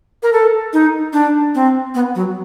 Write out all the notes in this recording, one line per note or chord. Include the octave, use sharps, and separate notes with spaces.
A#4
A4
D#4
D4
C4
B3
F#3